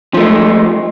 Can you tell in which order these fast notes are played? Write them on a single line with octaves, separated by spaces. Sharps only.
F3 A3 G#3